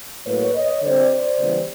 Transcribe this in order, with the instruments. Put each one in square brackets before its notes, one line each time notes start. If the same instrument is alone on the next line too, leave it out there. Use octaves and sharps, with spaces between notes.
[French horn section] A2 F#3 A#3 B4 C#5
C#5 D#5
D3 G3 C4 C5 D5
C5 D5
C#3 E3 G3 B3